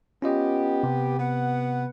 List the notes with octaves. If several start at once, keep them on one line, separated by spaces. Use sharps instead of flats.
B3 C#4 F4 G4 D#5
C3
B3 F#5